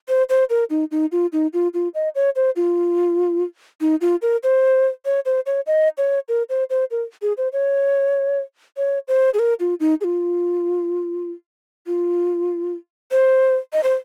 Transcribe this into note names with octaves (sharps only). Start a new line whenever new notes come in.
C5
C5
A#4
D#4
D#4
F4
D#4
F4
F4
D#5
C#5
C5
F4
D#4
F4
A#4
C5
C#5
C5
C#5
D#5
C#5
A#4
C5
C5
A#4
G#4
C5
C#5
C#5
C5
G#4
A#4
F4
D#4
G#4
F4
F4
C5
D#5
C5